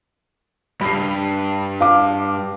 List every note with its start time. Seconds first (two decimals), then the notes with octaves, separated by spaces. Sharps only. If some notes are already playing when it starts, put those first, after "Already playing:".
0.81 G2 B5 C7
1.81 F5 D6